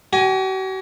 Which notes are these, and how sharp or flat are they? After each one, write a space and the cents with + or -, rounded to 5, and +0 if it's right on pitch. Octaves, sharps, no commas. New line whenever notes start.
F#4 +45 G#5 +0